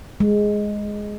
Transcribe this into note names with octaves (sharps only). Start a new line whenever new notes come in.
G#3